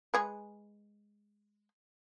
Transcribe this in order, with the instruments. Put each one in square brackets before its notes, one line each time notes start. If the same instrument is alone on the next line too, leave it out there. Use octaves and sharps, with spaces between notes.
[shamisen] G#3 G#4 B4